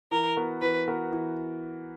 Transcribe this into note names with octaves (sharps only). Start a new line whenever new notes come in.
E3 A#4
B3 F#4 A#4
E3 B4
B3 F#4 A#4
E3